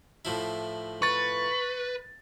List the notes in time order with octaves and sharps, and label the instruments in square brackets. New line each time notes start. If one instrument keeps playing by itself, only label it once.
[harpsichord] A2 F3 E4
[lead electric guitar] B4 [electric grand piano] C#6 A6